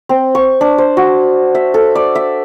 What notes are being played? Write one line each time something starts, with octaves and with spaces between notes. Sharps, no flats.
C4
C#6
D4
C5
F#4
E5
A4
D5
E5